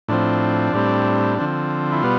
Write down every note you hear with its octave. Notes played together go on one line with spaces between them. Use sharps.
A2 F3 C4 D4
A2 G3 C4
D3 F3 C4
E4
B2 G3 B3 F4